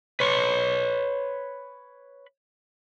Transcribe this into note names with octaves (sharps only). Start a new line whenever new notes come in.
B4 C#5